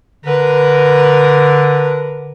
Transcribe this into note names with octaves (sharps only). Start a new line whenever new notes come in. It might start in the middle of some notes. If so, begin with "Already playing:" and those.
D3 A#4 B4